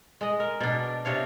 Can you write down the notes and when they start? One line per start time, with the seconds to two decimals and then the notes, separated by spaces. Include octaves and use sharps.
0.21 G#3 D#5
0.40 A#4
0.61 B2 D4
1.05 C3 D4 C#5 F5